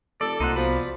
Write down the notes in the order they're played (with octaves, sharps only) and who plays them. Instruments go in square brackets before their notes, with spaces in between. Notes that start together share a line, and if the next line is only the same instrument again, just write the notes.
[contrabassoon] F1 [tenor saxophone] A4 [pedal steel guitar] D5
[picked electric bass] C2 [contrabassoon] A#2 [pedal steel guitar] D#4 C5 F#5
[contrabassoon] B2 [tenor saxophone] F3 [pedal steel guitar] D5 B5